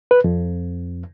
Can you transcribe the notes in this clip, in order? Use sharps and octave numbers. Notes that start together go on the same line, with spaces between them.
B4
F2